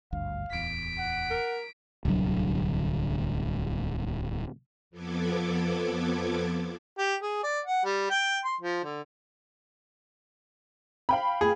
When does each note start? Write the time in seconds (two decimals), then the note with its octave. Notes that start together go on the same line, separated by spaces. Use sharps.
0.12 G#1 D2 G2 F5
0.50 D1 E2 B6 D7
0.98 F#5
1.31 A#4
2.05 D1 C2 D3 F#3
4.90 F2 F3 B3 A4 D6 G#6
6.98 G4
7.22 G#4
7.43 D5
7.66 F#5
7.85 G3
8.10 G5
8.45 C6
8.61 F3
8.84 D3
11.09 F5 G5 B5
11.41 G#4